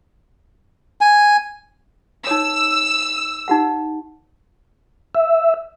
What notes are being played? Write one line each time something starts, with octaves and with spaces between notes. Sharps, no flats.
G#5
D#4 C#5 E6
D#4 G4 F#5
E5